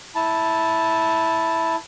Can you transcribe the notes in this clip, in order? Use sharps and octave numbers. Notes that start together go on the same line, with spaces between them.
E4 A5